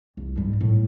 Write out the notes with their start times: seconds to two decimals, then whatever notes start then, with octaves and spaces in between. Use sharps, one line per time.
0.17 C2
0.36 G#2 G3
0.61 A2